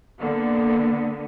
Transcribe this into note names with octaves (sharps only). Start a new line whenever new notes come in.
D3 A#3 B3